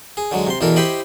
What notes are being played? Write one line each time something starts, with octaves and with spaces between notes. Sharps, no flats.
G#4
D3 F#3 G#3
C3 C6
E2 B2 E3 A4 A#4
E4 G4 C5 D#5 B5 D6